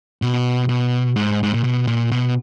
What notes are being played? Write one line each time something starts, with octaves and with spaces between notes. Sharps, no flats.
B2
B2
G#2
G#2
A#2
B2
A#2
B2